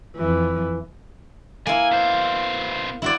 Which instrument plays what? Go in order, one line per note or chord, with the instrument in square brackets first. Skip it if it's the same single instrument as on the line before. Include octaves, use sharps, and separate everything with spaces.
[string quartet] F2 E3
[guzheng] A#3 E4 [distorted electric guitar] G#5
[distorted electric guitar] B2 C5
[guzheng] E4 F#4 D5